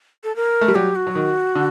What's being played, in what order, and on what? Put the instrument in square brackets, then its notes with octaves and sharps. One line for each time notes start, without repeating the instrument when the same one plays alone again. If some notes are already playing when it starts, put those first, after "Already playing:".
[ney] A4
A#4
[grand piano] A3
G3
[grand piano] F#3 [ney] G4
[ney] F#4
[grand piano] F#3
D#3
D3